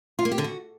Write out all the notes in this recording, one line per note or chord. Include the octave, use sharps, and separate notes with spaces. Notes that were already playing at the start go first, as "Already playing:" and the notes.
F4
A#3
G4
D3
F#4